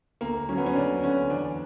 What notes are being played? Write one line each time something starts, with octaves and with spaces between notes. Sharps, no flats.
D2 A#3
F#3 C#4
B3
C#4
D2 D4
D3 C#4
E2 D4